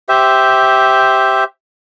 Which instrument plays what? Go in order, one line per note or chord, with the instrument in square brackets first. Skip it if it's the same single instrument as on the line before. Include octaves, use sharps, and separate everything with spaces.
[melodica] G4 C5 E5